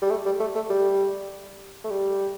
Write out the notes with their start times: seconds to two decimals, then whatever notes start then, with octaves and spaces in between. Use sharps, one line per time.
0.01 G3
0.10 A3
0.25 G3
0.40 A3
0.55 A3
0.69 G3
1.84 A3
1.90 G3